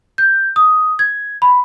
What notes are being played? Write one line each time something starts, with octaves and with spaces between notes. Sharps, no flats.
G6
D#6
G#6
B5